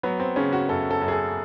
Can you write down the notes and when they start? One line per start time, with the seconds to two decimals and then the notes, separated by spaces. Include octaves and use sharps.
0.03 F#3 B3
0.20 C4
0.36 C#3 C#4
0.53 F#4
0.69 F#2 A4
0.91 A4
1.01 F#2
1.08 G#4
1.12 A4